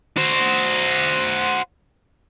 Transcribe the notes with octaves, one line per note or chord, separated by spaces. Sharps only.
F#4 C5